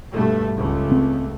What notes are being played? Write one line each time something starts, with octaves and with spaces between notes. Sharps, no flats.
G2 B2 A3
C#2 A3
C4